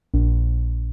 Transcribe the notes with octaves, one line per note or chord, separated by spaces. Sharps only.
A#1